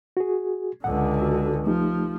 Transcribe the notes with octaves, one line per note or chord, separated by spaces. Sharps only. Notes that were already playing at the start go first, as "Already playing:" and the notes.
F#4 G#4
C#2 D3 F#5
F#4 A4
F3 A3 D#4 G4